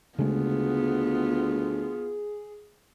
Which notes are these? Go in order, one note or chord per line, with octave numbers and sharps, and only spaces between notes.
D2 C#3 G#3 A3 B3 F4 G#4